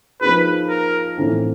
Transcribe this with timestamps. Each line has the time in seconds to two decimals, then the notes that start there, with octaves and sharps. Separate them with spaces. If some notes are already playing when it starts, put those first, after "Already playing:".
0.21 F3 A#3 D#4 G#4 B4
0.69 A#4
1.17 A2 E3 A3 C4